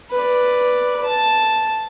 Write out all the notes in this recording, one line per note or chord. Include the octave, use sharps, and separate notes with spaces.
B4 D5
A5